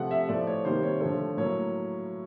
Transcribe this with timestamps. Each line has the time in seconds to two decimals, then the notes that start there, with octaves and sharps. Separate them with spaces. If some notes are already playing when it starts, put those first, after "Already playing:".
Already playing: C3 F3 A3 F#5
0.11 E5
0.29 A2 F3 A3 D5
0.47 C#5
0.65 C3 D#3 G3 A#3 C5
0.83 C#5
1.00 D3 F3 A3 C#5
1.37 A2 F#3 A#3 C#5